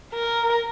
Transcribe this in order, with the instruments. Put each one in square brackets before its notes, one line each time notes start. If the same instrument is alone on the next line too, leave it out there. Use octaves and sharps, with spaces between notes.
[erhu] A#4